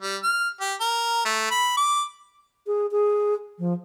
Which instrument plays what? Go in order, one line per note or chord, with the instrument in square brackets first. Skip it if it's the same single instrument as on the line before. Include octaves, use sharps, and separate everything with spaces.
[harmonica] G3
F6
G4
A#4
A3
B5
D6
[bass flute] G#4
G#4
F3